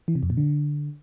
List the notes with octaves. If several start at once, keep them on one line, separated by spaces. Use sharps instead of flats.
E3
C3
F2
A#2
D3